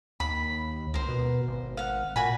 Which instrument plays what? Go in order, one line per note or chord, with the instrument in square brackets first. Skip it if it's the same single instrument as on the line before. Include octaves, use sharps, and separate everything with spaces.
[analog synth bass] D#2 [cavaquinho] B5
[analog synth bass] C#2 [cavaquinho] A#4 C5
[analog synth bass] B2
G#1
[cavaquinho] F5 F#5
[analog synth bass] A#2 [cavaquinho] F#4 G#5 B5